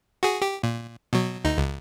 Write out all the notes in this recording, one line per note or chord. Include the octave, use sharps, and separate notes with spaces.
F#4 G#4
G4
A#2
B2 F#3
D2 D#4
C#2